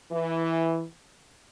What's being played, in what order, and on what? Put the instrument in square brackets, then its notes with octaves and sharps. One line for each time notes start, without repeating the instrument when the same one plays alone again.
[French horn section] E3